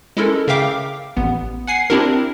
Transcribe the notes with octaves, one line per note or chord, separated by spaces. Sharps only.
G#3 C#4 E4 A4 A#4
C#3 A#4 E5 F5 G5 D6
A1 B3
F#5 G#5 C7
C4 D4 E4 G4 A#4